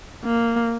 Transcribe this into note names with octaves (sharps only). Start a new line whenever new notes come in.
A#3